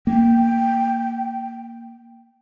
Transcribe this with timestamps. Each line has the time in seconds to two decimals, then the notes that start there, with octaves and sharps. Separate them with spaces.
0.07 A#3 G5